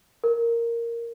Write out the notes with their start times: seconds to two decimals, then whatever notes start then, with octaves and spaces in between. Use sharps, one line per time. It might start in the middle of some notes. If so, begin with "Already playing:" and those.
0.24 A#4